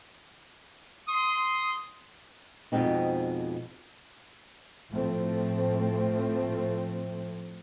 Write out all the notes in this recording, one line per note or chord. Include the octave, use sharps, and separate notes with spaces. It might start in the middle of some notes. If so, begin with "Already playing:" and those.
C6 D#6
F2 B2 E3 G#3 C4 D#4
A2 F3 A3 C4